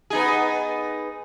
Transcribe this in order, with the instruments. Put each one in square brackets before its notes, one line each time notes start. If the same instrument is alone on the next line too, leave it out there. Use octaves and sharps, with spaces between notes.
[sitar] B3 D#4 G#4